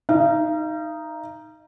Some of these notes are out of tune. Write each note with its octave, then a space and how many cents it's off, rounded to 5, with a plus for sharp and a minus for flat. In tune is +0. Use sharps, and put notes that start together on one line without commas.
D#4 +0 F5 -40